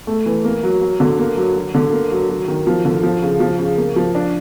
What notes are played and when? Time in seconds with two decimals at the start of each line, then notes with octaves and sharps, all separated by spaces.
0.07 A3
0.26 E3
0.45 A#3
0.63 F#3
0.81 F#3
1.00 D3
1.19 A#3
1.37 F#3
1.56 F#3
1.74 D3
1.92 A#3
2.11 F#3
2.29 F#3
2.48 D#3
2.67 F3
2.85 D3
3.03 F3
3.22 C#3
3.40 F3
3.59 C#3
3.78 A#3
3.96 F3
4.15 D4